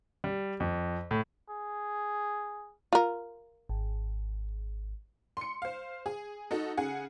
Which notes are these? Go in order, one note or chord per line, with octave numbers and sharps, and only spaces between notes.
G3
F2
A2
G#4
F4 A#4
G#1
C6 C#7
C5 F5
G#4
D#4 F#4 A4
C#3 G#4 F#5